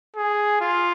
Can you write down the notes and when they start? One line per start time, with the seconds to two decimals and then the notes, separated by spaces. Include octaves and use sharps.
0.16 G#4
0.61 F4